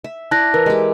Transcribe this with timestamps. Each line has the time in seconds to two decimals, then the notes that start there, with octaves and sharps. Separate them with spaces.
0.04 E5
0.31 E4 D5 A5 F#6 A#6
0.54 E3 A#4
0.66 G#3 G4